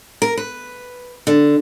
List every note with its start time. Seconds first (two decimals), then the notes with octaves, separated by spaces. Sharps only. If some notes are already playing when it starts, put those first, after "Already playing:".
0.22 A#4
0.37 B4
1.27 D3